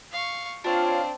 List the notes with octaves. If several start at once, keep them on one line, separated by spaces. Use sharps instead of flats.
F5 C#6
C4 D4 F4 C#5 F5